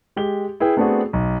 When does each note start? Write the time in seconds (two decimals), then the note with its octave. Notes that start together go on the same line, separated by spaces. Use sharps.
0.16 G#3 G4 G7
0.60 E4 G#4 B4 G5
0.77 A3 B3 C4 D4 F#4 G#4
1.13 B1